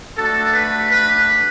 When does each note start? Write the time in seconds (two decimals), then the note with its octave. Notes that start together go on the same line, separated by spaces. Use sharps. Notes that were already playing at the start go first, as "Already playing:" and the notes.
0.17 A3 D4 F#4 A4
0.54 B4
0.92 B4